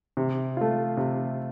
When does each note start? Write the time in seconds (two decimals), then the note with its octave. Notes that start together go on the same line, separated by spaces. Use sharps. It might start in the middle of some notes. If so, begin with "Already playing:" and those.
0.17 C3
0.57 A3 F4
0.97 C3